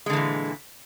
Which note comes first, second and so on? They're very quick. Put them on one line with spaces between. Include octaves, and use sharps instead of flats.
G#3 D3 E3 A#2